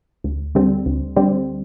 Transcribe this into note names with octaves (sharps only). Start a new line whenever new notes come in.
D2
D3 G3 C4
D2
D3 G3 C4